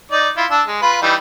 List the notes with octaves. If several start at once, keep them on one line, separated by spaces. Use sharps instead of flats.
D#4 D5
E4 F4
D4 E6
G#3
F4 B4
E3 G3 D#4